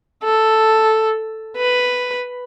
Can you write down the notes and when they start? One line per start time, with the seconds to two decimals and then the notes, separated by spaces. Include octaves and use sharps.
0.24 A4
1.57 B4